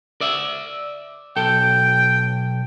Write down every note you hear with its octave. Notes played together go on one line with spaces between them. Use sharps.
D5 E5
B1 A4 G5